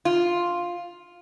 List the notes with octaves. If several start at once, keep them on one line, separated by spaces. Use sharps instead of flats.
F4